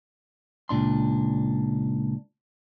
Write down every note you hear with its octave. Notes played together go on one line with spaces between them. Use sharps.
C#2 A#2 D4 C6